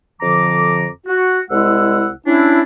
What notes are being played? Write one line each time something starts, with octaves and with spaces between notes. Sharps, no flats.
F2 D3 F3 A#5 D6
F#4
C2 G#3 E4 F#5 E6
C#4 D4 E4